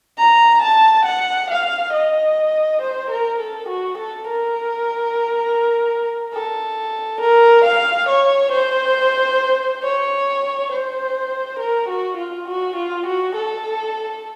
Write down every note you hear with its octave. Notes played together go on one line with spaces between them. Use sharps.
A#5
A5
F#5
F5
D#5
C5
A#4
A4
F#4
A4
A#4
A4
A#4
F5
C#5
C5
C#5
C5
A#4
F#4
F4
F#4
F4
F#4
A4